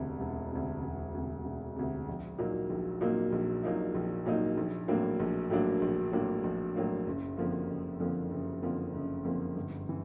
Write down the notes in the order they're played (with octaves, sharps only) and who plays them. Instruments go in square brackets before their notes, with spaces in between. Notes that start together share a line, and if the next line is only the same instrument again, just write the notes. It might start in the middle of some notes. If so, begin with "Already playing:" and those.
Already playing: [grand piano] E1 D2 C3
E1
D2 C3
E1
D2 C3
E1
D2 C3
A#1
A#2 F#3 A#3 D#4
A#1
A#2 F#3 A#3 D#4
A#1
A#2 F#3 A#3 D#4
A#1
A#2 F#3 A#3 D#4
A#1
A2 F#3 A#3 D4
A#1
A2 F#3 A#3 D4
A#1
A2 F#3 A#3 D4
A#1
A2 F#3 A#3 D4
F#1
F2 D3 F3 A#3
F#1
F2 D3 F3 A#3
F#1
F2 D3 F3 A#3
F#1
F2 D3 F3 A#3
G1
E3